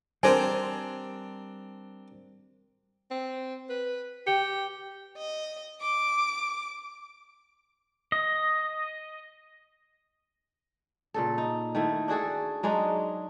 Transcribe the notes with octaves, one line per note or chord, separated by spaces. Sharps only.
G3 C4 D4 A#4 C5 G#5
C4
B4
G4 G5 C#7
D#5
D6
D#5
A#2 C#3 A4
D#4
D#3 A3 E4
D4 F#4 G#4 A4
F#3 G#3 D4 D#4